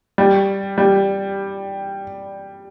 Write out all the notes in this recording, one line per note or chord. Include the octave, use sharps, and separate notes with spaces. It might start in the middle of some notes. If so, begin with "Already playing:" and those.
G3
G3